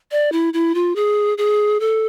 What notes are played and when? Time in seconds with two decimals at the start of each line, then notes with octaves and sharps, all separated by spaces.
0.11 D5
0.32 E4
0.53 E4
0.75 F4
0.96 G#4
1.38 G#4
1.80 A4